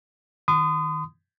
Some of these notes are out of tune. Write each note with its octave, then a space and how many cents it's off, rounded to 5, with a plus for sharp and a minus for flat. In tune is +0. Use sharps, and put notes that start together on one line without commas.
D#3 +0 C6 -45 D#6 -10